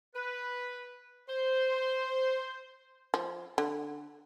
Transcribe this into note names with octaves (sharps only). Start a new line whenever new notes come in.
B4
C5
F3
D3